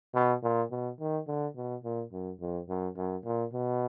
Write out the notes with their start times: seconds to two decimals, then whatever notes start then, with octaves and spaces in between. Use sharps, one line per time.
0.15 B2
0.43 A#2
0.71 B2
1.00 D#3
1.27 D3
1.56 B2
1.84 A#2
2.12 F#2
2.41 F2
2.69 F#2
2.97 F#2
3.25 A#2
3.53 B2